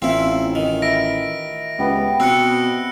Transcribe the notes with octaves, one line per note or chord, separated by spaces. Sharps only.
A1 C4 E4 F4
D#3
E5 B5 A#6 D7
C#2 G3 B3
B2 C4 E6 F#6 C#7